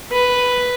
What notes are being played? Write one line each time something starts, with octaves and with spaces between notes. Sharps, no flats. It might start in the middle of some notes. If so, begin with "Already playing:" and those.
B4